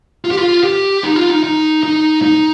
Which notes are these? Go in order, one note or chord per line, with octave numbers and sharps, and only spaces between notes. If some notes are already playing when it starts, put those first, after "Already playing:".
F4
G4
F4
G4
D#4
F4
D#4
D#4
D#4
D#4